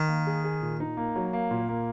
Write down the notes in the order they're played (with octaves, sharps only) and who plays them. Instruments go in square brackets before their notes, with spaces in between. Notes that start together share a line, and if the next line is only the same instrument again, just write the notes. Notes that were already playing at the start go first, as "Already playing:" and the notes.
Already playing: [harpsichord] D#3
[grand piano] A#3
G#4
G#4
A#2
D#4
A#3
F#3
A#3
A#2
A#3